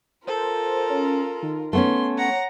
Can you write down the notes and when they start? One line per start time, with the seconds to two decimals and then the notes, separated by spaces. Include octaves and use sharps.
0.28 F4 A4 A#4 C5
0.90 C#4
1.42 D#3
1.73 A3 B3 C#4 C6
2.18 C#5 F#5 A#5